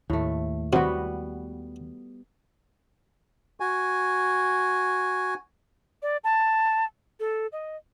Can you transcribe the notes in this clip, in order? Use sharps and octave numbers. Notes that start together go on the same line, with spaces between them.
D#2 A2 A3
C3 G3 B3 F#4
F#4 G#5
D5
A5
A4
D#5